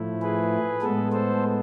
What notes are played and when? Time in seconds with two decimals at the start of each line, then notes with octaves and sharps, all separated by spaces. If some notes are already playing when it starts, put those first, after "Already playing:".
Already playing: A2 F3 A3 E4
0.22 G#4 B4
0.82 A2 G#3 B3 A4
1.12 A4 C5